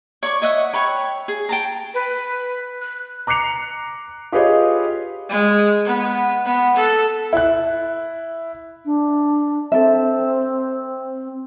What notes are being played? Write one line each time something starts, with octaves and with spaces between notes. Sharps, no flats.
C#5 D5 C#6
C#5 D#5 E5 F#5
C#5 G5 B5 C#6
G#4
G5 A5 A#5
B4
F#6
A#5 D6 F#6 C7 C#7 F7
F4 G4 G#4 B4 C#5 D#5
G#3
B3
B3
A4
E4 F#6
D4
C4 A4 E5